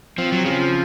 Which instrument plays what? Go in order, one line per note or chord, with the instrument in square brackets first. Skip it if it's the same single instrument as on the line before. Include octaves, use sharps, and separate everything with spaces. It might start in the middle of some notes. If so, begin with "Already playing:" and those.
[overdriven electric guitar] F3 [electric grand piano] C4
[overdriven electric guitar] F#3
[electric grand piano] C#3 [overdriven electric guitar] F3